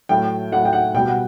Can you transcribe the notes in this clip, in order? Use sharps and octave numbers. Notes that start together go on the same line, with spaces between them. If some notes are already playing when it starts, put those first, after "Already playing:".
A2 F#3 A3 G5
A2 F#3 A3 F#5
G5
F#5
B2 G3 G5
F#5